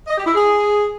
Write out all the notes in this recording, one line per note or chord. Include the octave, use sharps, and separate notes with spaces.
D#5
G4
E4
G#4